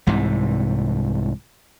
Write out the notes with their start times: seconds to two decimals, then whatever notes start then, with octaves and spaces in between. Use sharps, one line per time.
0.07 C2 G#2 C3 E3